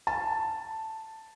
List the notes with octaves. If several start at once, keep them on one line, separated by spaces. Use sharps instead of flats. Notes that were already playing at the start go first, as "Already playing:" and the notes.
A5